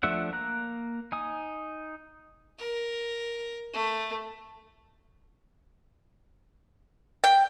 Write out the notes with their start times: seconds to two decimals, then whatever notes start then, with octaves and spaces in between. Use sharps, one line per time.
0.03 F3 A3 D4 E5 F#5
0.32 A#3 A#5 F#6
1.12 D#4 G#5 D#6
2.59 A#4
3.74 A3
7.24 G5